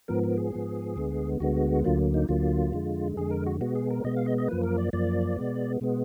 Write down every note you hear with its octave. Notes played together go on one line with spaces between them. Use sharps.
G#2 F3 B3 A#4
A#4
G#4
G#2 F3 B3
D2 D3 G#3 B3
D2 D3 G#3 B3 F#4
D2 D3 F#3 A#3 F4
D#4
D2 D3 F#3 A#3 F4
F2 D3 G#3
F2 D3 G#3 G#4
A#4
F#4
B2 G#3 B3 F#4
G#4
A#4
B2 G#3 B3 D#5
F5
D#5
D#5
F#2 F3 A#3 B4
A#4
D5
F#2 F3 A#3 D5
B2 G#3 B3
B2 G#3 B3